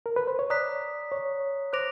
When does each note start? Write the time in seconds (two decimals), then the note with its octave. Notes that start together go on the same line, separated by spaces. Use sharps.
0.06 A#4
0.16 B4
0.27 C5
0.39 C#5
0.50 D5 A#5 D#6 F#6 B6
1.12 C#5
1.73 C5 D6 F#6 A#6 D7 F7